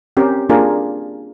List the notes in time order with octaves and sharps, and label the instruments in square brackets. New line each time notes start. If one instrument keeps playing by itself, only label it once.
[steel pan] C4 C#4 G4 A#4
A#3 D4 F4 G#4 A#4